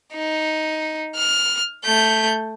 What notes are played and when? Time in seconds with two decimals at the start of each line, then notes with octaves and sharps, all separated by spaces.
0.14 D#4
1.16 F6
1.85 A3 G6